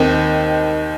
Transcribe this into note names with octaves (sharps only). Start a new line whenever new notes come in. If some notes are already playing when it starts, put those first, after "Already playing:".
Already playing: D#2 D#3 C4